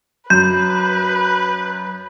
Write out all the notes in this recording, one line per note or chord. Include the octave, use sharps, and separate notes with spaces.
F#2 B4 G6